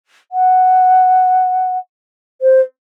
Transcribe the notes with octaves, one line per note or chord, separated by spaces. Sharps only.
F#5
C5